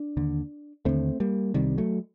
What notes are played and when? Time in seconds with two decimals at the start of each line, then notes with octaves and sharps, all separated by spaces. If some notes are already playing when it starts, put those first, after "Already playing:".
Already playing: D4
0.17 D#2 D3
0.85 D#2 D3 A3 C4
1.20 G3 A#3
1.54 C2 C3 D#3 G3
1.78 F#3 A3